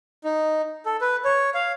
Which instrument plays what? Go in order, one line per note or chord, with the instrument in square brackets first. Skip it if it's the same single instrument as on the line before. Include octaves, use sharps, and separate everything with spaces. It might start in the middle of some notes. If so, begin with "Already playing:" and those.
[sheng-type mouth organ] D#4
A4
B4
C#5
F5